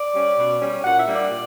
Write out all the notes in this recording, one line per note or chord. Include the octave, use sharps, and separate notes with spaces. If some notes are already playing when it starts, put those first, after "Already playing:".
Already playing: D5
G3 C#4
B2
G3 C#4
A#2 F#5
E5
G3 A#3 D4
D5
A#2